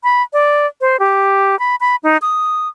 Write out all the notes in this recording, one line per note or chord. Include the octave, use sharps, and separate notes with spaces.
B5
D5
C5
G4
B5
B5
D#4
D#6